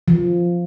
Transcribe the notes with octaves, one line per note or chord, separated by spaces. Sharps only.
F3